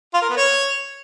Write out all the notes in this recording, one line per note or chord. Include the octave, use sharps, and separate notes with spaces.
F4
A#4
B3
C#5